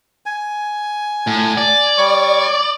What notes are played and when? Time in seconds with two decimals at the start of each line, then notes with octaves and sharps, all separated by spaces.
0.26 G#5
1.27 A2
1.58 D5
1.98 G3 C#5 C#6